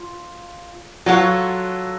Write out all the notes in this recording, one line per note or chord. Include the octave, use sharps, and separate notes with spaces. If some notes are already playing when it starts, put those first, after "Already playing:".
Already playing: F4
F#3 F4 A4 C#5 F#5